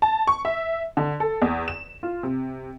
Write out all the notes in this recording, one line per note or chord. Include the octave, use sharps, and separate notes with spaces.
A5
C#6
E5
D3
A4
E2
E7
F4
C3